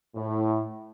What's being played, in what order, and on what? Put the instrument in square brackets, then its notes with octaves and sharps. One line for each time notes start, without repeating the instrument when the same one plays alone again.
[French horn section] A2